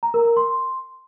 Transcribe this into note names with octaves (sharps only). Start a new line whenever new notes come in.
A#5
A#4
A#4
C6